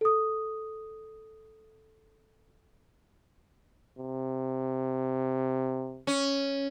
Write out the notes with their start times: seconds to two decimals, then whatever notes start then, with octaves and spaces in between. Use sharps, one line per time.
0.01 A4 D#6
3.99 C3
6.07 C#4